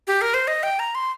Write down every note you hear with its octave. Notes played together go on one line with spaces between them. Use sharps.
G4
A#4
C5
D#5
G5
A#5
C6